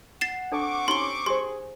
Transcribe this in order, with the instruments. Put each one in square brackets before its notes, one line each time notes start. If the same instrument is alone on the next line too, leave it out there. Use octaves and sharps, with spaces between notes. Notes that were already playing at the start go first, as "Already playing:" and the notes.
[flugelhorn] F#5 [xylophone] A6 C7 E7
[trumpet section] C4 C#6 D6 [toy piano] D4 A4 A5
[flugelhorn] C#4 [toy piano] D#4 G4 A#5 [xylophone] C6 G7
[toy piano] G4 C5 [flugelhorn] G#4 [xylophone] C6